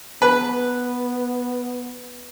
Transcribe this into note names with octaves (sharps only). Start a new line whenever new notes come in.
B3 B4